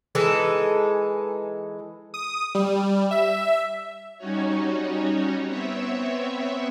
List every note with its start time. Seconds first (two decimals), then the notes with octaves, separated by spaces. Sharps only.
0.15 E3 G#3 D#4 A4
2.14 D#6
2.55 G3
3.11 E5
4.18 G3 C#4 D#4 F#4 C#5
5.44 B3 C4 C#5 E5